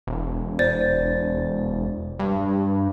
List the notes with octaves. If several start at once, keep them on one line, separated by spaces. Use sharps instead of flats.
E1
C5 D5 A6
G2